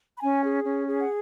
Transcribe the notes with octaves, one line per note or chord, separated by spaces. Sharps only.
B5
C#4 G#5
G#4
C#4
G#4
F#5